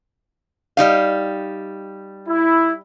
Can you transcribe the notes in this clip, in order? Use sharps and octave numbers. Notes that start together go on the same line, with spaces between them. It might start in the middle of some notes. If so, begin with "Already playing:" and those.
G3 D#4 F5
E4